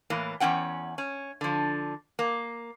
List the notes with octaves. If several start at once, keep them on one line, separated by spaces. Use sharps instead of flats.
A2 E3 A#3
E2 F3 C#4 F#5 G5
C#4
D3 F3
A#3